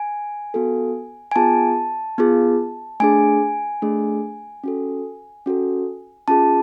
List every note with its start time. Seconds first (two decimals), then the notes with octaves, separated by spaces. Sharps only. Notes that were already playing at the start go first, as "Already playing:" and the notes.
Already playing: G#5
0.54 B3 F#4 A4
1.31 G#5
1.36 B3 F4 G#4 A5
2.18 B3 F4 G#4
3.00 A3 D4 G#4 G#5
3.82 A3 D4 G#4
4.64 C#4 F#4 A4
5.46 C#4 F#4 A4
6.28 C#4 F4 G#4 A5